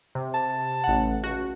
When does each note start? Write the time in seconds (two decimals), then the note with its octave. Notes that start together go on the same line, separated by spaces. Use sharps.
0.15 C3
0.34 A5
0.84 A1 F#5
1.23 C#2 F#4